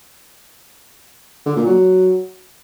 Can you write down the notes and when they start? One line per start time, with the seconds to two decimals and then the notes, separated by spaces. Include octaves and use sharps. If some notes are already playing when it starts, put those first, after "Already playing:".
1.46 D3
1.56 A#2
1.66 F#3